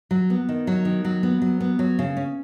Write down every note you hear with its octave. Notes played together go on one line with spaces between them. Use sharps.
F#3
B3
D#3
F#3
D#3
F#3
B3
F#3
B3
F#3
C#3
C#4